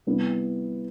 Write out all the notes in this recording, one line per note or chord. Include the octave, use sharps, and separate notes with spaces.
C3 G3 B3 E4